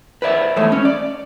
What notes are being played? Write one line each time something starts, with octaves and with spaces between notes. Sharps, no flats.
B4 C5 D5 E5
E2 G#3 A3 C#5 E5
C#4
D5